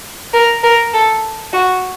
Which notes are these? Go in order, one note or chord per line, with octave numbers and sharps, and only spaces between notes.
A#4
A#4
A4
F#4